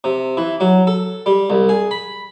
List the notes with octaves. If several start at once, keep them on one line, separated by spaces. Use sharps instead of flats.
C3
E3
F#3
A4
G3
C2
G#4
B5